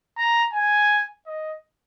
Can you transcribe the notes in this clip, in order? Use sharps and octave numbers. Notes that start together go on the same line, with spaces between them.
A#5
G#5
D#5